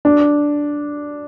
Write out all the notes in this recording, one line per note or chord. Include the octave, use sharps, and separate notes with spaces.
D4